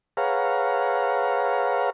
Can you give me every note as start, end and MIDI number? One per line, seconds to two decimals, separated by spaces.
0.17 1.90 68
0.17 1.90 71
0.17 1.90 73
0.17 1.90 77
0.17 1.90 78
0.17 1.90 82